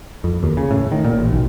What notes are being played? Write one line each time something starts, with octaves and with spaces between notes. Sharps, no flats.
F2
D#2
C#3
A2
D#3
A#2
A1
B1